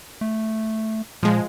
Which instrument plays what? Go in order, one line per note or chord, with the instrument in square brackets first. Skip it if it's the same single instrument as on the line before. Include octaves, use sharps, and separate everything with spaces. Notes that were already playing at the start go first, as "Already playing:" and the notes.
[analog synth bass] A3
[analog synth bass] A#2 [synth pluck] F3 G#3